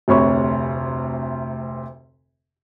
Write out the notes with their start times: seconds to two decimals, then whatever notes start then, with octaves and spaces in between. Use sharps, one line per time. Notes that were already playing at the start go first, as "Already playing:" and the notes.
0.08 F1 D2 C3 C#5 B5 C#6